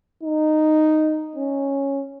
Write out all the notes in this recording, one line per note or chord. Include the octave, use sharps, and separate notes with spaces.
D#4
C#4